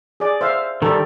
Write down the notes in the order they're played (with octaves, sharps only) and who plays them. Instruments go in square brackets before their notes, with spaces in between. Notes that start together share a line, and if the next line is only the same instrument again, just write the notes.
[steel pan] G#4 D5
C5 E5 F5
[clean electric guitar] D#3 G3 [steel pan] G4 A4